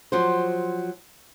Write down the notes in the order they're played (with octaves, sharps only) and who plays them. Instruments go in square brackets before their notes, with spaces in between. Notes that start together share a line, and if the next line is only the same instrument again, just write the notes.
[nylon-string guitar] F3 F#3 C5